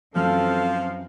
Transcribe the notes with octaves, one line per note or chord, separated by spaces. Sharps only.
F#2 E3 F3 C4 A4 F5